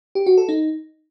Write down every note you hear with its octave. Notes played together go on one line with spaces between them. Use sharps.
G4
F#4
A4
D#4